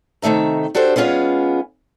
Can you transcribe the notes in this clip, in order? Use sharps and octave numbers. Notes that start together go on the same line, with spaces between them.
C3 D#3 A3 E5 A#5
D4 F#4 G4 A4 C5
G#3 B3 C#4 F4 G#4